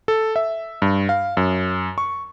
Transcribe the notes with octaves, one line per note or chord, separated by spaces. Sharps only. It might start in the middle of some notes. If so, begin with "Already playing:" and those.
A4
E5
G2
F5
F#2
C#6